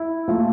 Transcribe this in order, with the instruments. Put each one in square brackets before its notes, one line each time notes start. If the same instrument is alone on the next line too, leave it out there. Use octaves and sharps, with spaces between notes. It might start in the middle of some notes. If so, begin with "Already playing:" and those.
Already playing: [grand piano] E4
A#2 F3 A3 F4